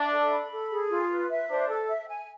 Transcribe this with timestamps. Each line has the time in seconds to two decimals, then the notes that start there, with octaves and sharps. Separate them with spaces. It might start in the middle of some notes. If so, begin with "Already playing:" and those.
Already playing: D4 E5
0.12 A4
0.31 B5
0.51 A4
0.71 G#4
0.90 F4
1.10 B4
1.30 E5
1.49 D4 C5
1.69 A4
1.88 E5
2.08 G#5